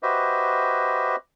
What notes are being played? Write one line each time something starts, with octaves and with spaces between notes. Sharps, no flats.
F#4 G4 B4 C5 D#5 E5